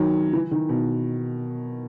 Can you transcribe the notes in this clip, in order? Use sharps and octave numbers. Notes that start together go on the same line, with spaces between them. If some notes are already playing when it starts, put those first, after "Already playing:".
Already playing: D#3 F#3
E3
D#3
B2